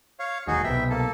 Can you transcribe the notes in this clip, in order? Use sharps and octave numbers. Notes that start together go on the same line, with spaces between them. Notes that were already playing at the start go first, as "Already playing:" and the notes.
C#5 F5
E1 D#2 D#4 F#4 G#4
C2 B2 E5 G5
A#3 A4